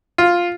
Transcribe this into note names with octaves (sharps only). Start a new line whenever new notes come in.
F4